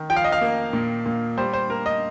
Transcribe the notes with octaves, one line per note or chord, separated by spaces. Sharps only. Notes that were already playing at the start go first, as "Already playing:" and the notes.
Already playing: D#3
F3 G5
F5
D#5
F5
A#3
A#2
A#2
G3 C5
C5
A#3 A#4
D#5